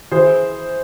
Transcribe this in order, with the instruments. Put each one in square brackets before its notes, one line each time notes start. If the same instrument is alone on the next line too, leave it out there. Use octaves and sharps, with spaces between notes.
[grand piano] E3 G#4 C5